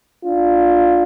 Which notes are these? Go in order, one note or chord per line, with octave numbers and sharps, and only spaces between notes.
D4 F4